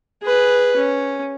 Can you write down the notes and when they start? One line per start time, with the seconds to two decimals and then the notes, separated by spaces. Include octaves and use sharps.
0.23 G#4 B4
0.76 C#4